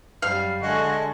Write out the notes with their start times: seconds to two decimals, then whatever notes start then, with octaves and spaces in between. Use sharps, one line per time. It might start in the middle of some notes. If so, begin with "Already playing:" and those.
0.22 F#2 G3 F5
0.62 D3 G#3 A3 F#4 D#5